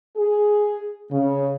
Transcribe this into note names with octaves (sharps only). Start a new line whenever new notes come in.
G#4
C#3